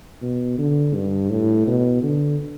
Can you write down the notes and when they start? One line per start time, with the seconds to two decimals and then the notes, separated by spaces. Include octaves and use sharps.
0.22 B2
0.58 D3
0.94 G2
1.30 A2
1.67 B2
2.03 D3